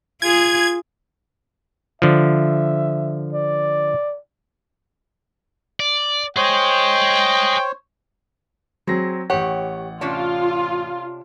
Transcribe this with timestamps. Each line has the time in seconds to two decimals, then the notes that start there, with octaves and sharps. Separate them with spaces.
0.22 F4 G#4 G#6
2.02 D3 F3 E5
3.33 D5
5.80 D5
6.37 G#4 C5 C#5 D#5 G5
8.87 F#3 C4 G#4 A#6
9.30 A1 G4 C#5 F#5
10.01 C3 C#4 D4 F4